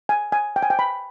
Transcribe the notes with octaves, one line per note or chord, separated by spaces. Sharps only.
G#5
G#5
G5
G#5
G5
B5